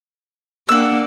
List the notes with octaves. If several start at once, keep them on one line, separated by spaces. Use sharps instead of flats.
A#3 D4 F#5 E6